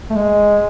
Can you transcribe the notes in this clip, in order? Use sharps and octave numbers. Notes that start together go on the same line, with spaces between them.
A3
G#3